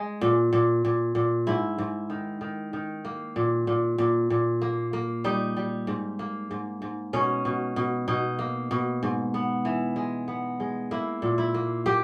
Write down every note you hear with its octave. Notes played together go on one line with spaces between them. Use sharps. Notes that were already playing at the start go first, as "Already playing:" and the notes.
Already playing: G#3
A#2
A#2
A#2
A#2
G#2 E4
G#2
D#3
D#3
D#3
A#3
A#2
A#2
A#2
A#2
A#3
A#3
G3 D#4
G3
G#2
A#3
G#2
G#2
B2 C#4
B2
B2
B2 D#4
A#3
B2
G#2
B3
E3
G#3
B3
G#3
A#3 E4
A#2
E4
A#3
A#3 G4